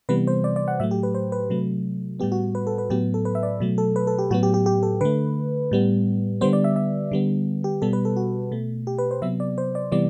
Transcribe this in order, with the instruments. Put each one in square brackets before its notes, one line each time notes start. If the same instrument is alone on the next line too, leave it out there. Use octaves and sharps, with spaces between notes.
[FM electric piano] C3 E3 G3 B3 B4
C5
D5
D5
F#5
A2 F#3 A3 E5
G4
B4
C5
B4
C3 F#3 A3
A2 G3 B3 G4
F#4
B4
A4
B4
A2 F#3 B3 G4
A4
B4
E5
D5
B2 F#3 A3
A4
B4
A4
G4
A2 F#3 B3 F#4
G4
G4
G4
A4
D3 A3 B4
A2 G3 B3
D3 G3 B3 C5
D5
E5
E5
D3 G3 B3
G4
B2 G3 B3 A4
B4
A4
F#4
B2 A3
G4
B4
C5
C3 F#3 B3 E5
D5
C5
D5
C3 E3 G3 B3 D5